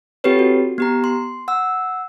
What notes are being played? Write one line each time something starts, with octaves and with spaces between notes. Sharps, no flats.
C4 F4 G4 A4 B4 C#5
F#4
B3 G4 A#5
C6
F#5 E6